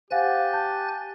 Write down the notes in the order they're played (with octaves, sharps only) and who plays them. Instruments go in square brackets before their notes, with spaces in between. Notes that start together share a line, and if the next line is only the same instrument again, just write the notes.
[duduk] G4 [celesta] C5 F5 F#5 [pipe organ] G#5 F#6 A6
[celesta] A5 G6